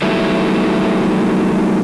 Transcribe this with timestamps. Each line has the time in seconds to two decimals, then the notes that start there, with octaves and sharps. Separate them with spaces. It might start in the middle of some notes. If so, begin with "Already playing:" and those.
0.02 D#3 F#3 G3 A3 B3 E4